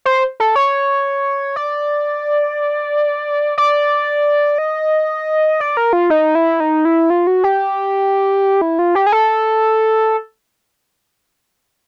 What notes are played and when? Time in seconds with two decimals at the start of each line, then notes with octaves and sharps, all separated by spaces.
0.05 C5
0.40 A4
0.56 C#5
1.56 D5
3.58 D5
4.58 D#5
5.60 D5
5.77 A#4
5.93 F4
6.10 D#4
6.35 E4
6.60 D#4
6.85 E4
7.10 F4
7.27 F#4
7.44 G4
8.61 E4
8.79 F4
8.95 G4
9.07 G#4
9.12 A4